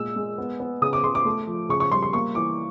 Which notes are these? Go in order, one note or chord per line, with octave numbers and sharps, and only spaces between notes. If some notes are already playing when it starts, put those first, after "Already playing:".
Already playing: A#2 G#3 E6
G#3
B3
B3
C#3 D#6
D6
C#3 C6
D6
A3
F3
C#3 C#6
C#6
G3 C6
C6
A#3 C#6
E3 D6